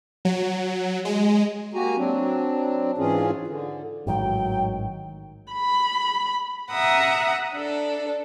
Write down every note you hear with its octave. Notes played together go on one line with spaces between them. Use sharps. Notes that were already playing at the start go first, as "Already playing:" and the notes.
F#3
G#3
A#3 F#4 G4 G#5 A#5
F#3 C4 D4
G#2 E3 C#4 F4 G#4
D3
A1 G#2 D#3 F#3 G5
B5
E5 F#5 A#5 D#6
D4 A4